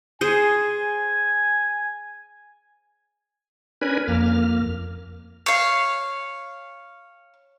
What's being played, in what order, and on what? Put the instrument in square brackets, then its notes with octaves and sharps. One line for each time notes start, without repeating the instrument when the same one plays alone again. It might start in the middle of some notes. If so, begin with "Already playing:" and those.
[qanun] G#4 C5 [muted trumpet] G#5
[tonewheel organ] C#4 D4 A#4 B4 G#5 B5
F2 A#3 F6
[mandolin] C#5 F5